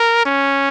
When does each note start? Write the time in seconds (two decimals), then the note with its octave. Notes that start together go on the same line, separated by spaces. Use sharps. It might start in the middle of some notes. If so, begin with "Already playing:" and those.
Already playing: A#4
0.26 C#4